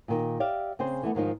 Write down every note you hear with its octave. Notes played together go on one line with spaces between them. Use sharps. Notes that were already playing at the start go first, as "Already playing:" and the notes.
A#2 D#3
G4 D5 E5 F5
C#3 C4 G#4 C5
E3 A3 B3
G#2 D#3 F3 D#4